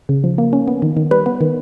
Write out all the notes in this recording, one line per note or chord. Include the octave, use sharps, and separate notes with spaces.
C#3
F3
A#3
C#4
B3
D#3
D#3
G3 B4
B3
D#3